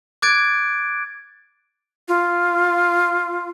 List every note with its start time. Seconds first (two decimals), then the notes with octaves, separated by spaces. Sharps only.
0.22 D6 F#6 G#6 A6 D7
2.08 F4